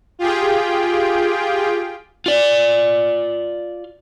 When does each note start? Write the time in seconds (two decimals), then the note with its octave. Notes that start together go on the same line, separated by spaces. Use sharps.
0.19 F4 G4 G#4 G5
2.26 F4 D5